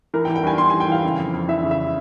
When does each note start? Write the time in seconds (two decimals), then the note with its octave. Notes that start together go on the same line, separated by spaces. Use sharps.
0.14 E3 A#4
0.25 G5
0.29 E3
0.36 G5
0.43 G2 G#5
0.58 G2 C6
0.70 E3 G#5
0.80 G5
0.88 E3 F5
1.04 C#3
1.18 F2
1.34 F2
1.48 E3 E5
1.63 C#3
1.71 E5